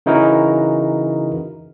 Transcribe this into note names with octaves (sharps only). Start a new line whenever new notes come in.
C#3 E3 D#4 E4 F#4 A#4